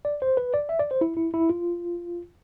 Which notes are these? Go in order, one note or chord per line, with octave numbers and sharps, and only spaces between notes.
D5
C5
B4
D5
E5
D5
C5
E4
E4
E4
F4